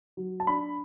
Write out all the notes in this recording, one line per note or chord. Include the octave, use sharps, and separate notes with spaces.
F#3
A5
D4 B5